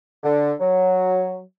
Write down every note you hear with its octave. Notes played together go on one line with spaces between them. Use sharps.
D3
F#3